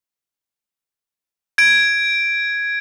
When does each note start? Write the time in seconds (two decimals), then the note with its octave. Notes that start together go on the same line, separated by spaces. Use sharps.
1.58 G#6 D7